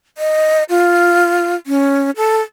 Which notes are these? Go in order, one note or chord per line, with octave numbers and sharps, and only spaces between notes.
D#5
F4
C#4
A4